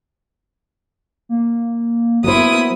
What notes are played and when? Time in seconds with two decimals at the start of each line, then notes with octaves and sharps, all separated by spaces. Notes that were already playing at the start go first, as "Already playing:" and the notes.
1.29 A#3
2.24 F#3 A#3 B3 E4 C5 D#6